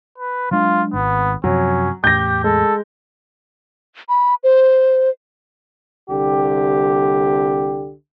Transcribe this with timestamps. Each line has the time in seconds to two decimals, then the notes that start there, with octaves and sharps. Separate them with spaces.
0.18 B4
0.51 F#3 G#3 D4 F4
0.94 G#1 B3
1.44 F#2 C3 F3 F#3 C#4
2.04 E2 A2 G4 G6 A#6
2.44 G#3 A4
4.09 B5
4.44 C5
6.09 C2 D3 G4